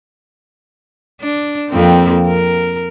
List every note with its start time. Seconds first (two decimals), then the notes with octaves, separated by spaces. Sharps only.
1.21 D4
1.70 F2 A#3 C4
2.27 A#4